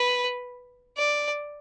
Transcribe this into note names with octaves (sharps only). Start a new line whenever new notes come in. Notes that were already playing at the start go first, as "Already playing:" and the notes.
Already playing: B4
D5